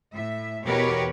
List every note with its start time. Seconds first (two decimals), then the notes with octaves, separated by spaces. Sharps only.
0.14 A2 E5
0.65 E2 B2 G4 A#4 B4 C#5